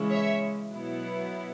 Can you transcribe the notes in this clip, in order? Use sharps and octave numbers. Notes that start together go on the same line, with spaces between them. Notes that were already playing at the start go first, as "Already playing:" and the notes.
Already playing: C#3 E3 G#3 C#4 E4
C#5 E5
B2 F#3 B3 E4